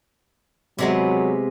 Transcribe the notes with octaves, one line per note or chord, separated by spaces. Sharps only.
C3 F#3 G#3 B3